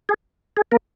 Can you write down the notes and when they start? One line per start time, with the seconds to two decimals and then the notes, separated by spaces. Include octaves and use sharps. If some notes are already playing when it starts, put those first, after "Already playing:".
0.09 G#4
0.57 G#4
0.72 A#3 A#4